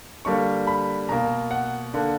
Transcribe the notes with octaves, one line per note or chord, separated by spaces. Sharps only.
D3 G3 A#3 C#6
B5
B2 A#3 A#5
F#5
D3 A#3